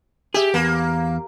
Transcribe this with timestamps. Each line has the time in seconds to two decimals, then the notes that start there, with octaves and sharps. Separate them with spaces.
0.34 G4 G#4 E5
0.54 E2 A#3